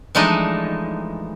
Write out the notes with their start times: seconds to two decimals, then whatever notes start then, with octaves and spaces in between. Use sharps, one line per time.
0.15 E3 F3 G#3 A3 D4 D#4